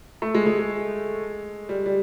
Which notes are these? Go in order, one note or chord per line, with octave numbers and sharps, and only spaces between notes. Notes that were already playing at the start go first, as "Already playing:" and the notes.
A3
G#3
G#3
G#3
G3
G3